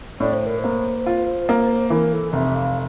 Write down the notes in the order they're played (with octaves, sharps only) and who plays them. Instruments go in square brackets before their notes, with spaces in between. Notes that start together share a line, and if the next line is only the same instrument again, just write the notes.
[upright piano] A2 [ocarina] D5
[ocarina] C5
A#4
C5
[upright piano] A#3
F4
A#3
[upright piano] E3 [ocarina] A#4
[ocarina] A4
[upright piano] F1 [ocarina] E5
[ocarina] F5